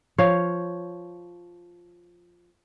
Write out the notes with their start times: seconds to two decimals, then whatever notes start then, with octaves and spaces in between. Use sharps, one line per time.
0.18 F3 C#5 F5